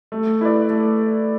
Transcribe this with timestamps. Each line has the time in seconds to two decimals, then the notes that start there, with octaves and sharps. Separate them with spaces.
0.12 A3
0.41 E4 B4 D5
0.70 A3